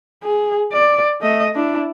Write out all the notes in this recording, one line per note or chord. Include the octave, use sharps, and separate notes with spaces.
G#4
D5
A3 D#5
D4 E4